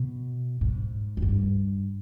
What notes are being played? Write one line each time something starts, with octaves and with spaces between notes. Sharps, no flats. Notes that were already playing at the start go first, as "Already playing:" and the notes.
Already playing: B2
G#2
F2
G2